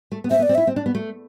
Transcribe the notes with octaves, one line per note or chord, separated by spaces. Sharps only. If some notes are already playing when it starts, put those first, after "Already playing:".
A3
B3
C4 E5
B3
D5
C4
E4 E5
C4
D4
B3
A3